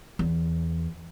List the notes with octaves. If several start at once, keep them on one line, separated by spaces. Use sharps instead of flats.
E2